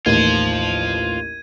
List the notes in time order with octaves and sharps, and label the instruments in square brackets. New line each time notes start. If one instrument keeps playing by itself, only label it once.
[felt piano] A1 D#2 [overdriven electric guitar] F4 C5 [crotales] G#6 D#7